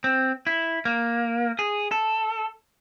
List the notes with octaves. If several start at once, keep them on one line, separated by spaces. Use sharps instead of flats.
C4
E4
A#3
G#4
A4